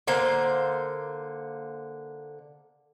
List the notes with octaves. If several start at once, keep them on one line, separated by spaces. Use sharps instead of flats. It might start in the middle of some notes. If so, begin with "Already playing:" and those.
D3 A#3 C5